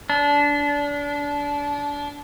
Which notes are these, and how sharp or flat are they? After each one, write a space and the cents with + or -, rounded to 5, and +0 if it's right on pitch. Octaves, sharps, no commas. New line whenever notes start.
D4 -25